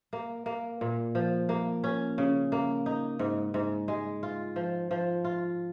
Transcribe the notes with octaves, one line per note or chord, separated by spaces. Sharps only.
A#3
A#3
A#2
F3
A#3
C#4
C#3
A#3
D#4
G#2
G#2
G#3
F4
F3
F3
F4